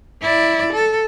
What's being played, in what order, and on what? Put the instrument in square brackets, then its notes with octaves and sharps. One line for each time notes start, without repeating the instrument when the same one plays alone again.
[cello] E4 D5
A4